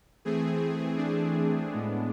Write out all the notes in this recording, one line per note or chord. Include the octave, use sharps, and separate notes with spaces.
E3 A3 C4 G#4
D4
A2 G#3 B3